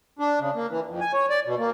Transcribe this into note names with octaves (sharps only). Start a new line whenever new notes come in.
D4
C#3
A#3
E3
F2
G#5
C#5
D5
B2
A#3